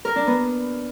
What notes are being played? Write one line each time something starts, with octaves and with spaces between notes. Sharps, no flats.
A#4
D4
B3